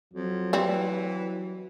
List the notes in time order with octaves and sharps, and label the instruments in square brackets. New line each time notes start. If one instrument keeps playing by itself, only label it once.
[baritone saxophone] F2 [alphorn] F#3
[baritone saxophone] E3 [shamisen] G3 C4